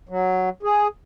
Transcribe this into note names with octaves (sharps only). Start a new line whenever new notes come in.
F#3
G#4